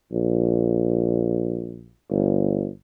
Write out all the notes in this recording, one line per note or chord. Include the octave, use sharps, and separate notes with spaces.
A#1
G1